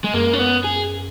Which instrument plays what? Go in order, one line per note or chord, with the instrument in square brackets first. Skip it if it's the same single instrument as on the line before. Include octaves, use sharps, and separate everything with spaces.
[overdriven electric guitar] G#3
[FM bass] F#2 [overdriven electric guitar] A#3
[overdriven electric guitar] C#4
B3
G#4